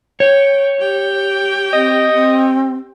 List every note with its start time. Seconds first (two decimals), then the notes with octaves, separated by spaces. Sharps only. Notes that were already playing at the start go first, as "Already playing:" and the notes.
0.20 C#5 G5
0.79 G4 G5
1.73 C4 D#5
2.13 C4